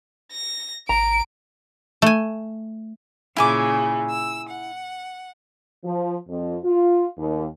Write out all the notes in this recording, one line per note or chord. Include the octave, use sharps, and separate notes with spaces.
A#6
G#1 A#5 D7
A3 G#5
A#2 C#3 E4 G#5 D6
E6
F#5
F3
F2
F4
D#2